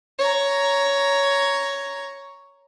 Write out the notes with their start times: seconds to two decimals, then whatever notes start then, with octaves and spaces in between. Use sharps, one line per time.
0.18 C#5 A#5